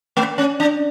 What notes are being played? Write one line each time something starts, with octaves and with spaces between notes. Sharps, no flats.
A3
C#4
D4